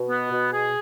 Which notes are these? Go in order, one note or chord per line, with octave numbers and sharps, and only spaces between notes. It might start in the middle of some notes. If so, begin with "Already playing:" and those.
Already playing: B2
B3
B2
G#4